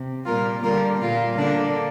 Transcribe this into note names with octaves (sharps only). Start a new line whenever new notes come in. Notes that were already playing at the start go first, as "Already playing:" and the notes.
Already playing: C3
A#2 G3 A#3 F4 A#4
D3 G3 A#3 F4 A#4
A#2 A#3 F4
D3 A#3 D4